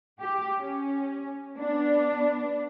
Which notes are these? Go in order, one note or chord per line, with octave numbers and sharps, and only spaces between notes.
G4
C#4
B3 D4